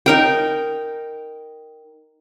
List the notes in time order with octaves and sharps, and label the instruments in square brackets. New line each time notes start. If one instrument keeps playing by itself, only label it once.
[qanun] D#4 A#4 G5